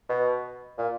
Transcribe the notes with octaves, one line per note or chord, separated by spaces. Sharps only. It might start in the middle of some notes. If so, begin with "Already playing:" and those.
B2
A#2